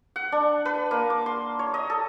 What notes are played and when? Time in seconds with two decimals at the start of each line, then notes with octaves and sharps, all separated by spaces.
0.16 F#5
0.32 D4
0.65 B4
0.91 A#3
1.10 D6
1.26 C6
1.59 C#5
1.74 D#5
1.90 A4